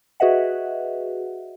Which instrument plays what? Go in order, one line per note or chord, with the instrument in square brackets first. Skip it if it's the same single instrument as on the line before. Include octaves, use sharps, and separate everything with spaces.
[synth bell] F#4 G#4 B4 D#5 E5 F#5